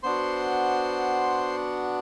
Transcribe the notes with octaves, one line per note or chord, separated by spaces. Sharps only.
B3 D4 F#4 C5 C6